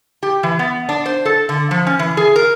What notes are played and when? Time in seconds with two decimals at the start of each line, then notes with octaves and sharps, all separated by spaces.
0.23 G4
0.43 E3
0.59 B3
0.89 D4
1.06 C5
1.25 A4
1.49 D3
1.71 F3
1.87 C#4
1.99 E3
2.17 G#4
2.36 A#4